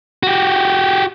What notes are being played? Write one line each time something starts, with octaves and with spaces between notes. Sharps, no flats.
F#4 G4